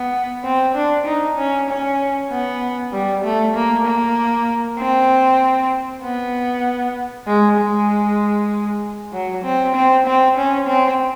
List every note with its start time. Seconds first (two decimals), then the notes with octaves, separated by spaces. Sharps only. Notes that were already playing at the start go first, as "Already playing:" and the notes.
Already playing: B3
0.44 C4
0.75 D4
1.06 D#4
1.37 C#4
1.68 C#4
2.30 B3
2.92 G3
3.23 A3
3.54 A#3
3.85 A#3
4.79 C4
6.03 B3
7.27 G#3
7.58 G#3
9.13 F#3
9.44 C4
9.75 C4
10.06 C4
10.37 C#4
10.68 C4